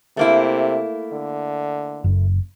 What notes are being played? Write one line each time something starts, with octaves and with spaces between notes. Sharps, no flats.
C3 A3 A#3 E4
D3
F#1